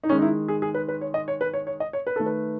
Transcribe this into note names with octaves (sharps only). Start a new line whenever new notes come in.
D#4
D#3 G#3 C#4
D#4
E4
G#4
G#4
B4
B4
C#5
D#5
C#5
B4
C#5
C#5
D#5
C#5
B4
D#3 A3 A4
B4